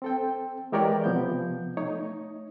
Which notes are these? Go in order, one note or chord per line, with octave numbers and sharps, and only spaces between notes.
C4 A4 G5
E3 G#3 G4 A#4 C#5 D5
C3 F3 B3 G6
A3 D#4 C#5